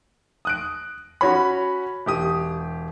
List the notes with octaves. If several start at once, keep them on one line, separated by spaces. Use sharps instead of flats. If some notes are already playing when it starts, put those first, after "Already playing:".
D#6 F#6 D7
C#4 F#4 C#5 B5
E1 G4 D#6